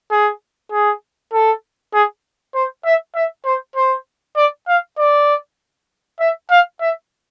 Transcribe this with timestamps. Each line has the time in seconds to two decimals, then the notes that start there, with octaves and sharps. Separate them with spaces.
0.11 G#4
0.72 G#4
1.33 A4
1.94 G#4
2.55 C5
2.85 E5
3.15 E5
3.45 C5
3.76 C5
4.37 D5
4.68 F5
4.98 D5
6.20 E5
6.51 F5
6.81 E5